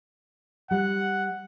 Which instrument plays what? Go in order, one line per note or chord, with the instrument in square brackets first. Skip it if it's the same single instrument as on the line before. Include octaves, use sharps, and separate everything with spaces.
[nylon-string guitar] G3 [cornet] F#5